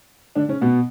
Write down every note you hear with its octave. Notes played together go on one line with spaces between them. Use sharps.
D3 D4
C#3 C#4
B2 B3